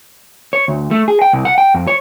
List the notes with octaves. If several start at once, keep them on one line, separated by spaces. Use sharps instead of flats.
C#5
D2
A3
G#4
G5
C2
F#5
G5
F2
C#5